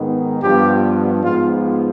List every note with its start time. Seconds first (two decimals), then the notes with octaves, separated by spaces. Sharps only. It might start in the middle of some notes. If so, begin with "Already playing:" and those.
Already playing: G#2 D#3 B3
0.42 G2 F3 B3 G4
1.23 G#2 F3 B3 F4